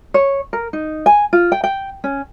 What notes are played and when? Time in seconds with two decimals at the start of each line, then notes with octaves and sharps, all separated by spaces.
0.14 C#5
0.53 A#4
0.73 D#4
1.06 G#5
1.33 F4
1.52 G5
1.64 G5
2.04 C#4